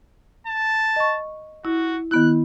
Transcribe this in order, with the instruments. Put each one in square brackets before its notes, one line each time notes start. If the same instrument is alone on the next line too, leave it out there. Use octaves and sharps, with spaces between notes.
[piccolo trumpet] A5
[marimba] D#5 C#6
[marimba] E4 [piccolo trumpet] F#4
[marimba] D#3 B3 E4 [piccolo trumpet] F#6